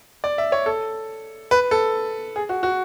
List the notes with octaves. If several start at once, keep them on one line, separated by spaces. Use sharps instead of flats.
D5
E5
C#5
A4
B4
A4
G#4
F#4
F#4